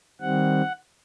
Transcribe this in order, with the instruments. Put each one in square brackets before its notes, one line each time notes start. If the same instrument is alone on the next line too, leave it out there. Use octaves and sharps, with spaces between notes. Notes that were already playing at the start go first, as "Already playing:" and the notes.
[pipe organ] D#3 G3 C4 F#5